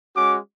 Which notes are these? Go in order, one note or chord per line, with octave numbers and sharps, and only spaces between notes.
G#3 C#4 F#4 D6